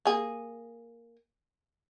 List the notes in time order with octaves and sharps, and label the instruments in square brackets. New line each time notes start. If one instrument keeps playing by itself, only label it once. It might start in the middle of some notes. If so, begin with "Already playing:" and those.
[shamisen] A#3 G#4